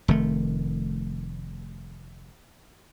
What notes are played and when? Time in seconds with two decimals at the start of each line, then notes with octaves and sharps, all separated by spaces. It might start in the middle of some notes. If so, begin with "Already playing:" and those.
0.08 F1 D#3 A3